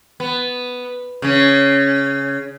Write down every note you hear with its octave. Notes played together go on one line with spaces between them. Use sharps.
B3
C#3 C#4